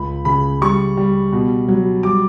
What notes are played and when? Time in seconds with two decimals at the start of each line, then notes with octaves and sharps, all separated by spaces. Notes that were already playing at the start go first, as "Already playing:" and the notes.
Already playing: C#2 B5
0.25 C#3 B5
0.61 G3 C#6
0.97 G3
1.32 B2
1.68 F#3
2.03 G3 D6